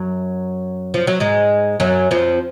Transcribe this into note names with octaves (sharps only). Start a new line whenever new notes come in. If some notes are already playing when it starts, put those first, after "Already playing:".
Already playing: F#2 F#3
F3
F#3
G#2 G#3
F#2 F#3
F2 F3